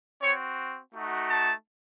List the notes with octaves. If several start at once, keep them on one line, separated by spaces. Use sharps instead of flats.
C4 F#4 C#5
A3 D#4 F#4
A5